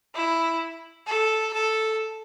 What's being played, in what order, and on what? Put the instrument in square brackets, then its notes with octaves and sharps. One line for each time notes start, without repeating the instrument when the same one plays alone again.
[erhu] E4
A4
A4